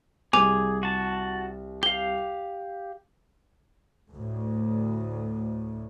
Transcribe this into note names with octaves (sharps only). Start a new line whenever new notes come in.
C2 G#4 G#5 D6 F7
F#4 A5
G4 F5 G7
D2 A2